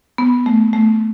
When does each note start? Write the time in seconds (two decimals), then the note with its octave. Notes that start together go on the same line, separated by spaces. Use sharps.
0.18 B3
0.46 A3
0.73 A3